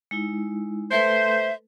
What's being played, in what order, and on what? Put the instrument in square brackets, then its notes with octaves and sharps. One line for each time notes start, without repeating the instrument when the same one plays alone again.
[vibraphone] G#3 D#4 E4
[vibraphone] A3 A4 B4 [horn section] C5 [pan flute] E5